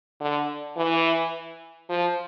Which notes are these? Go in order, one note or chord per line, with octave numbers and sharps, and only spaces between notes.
D3
E3
F3